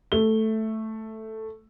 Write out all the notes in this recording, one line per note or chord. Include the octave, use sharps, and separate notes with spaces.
A3 G7